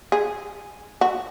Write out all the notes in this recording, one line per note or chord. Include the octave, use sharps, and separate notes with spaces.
G#4
F#4